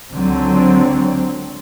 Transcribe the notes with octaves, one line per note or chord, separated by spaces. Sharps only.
C#2 D3 F#3 C4